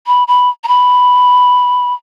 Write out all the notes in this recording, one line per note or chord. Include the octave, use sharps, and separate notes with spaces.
B5
B5
A#5
B5